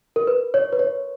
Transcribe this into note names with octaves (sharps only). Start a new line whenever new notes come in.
A#4
B4
C#5
B4
C#5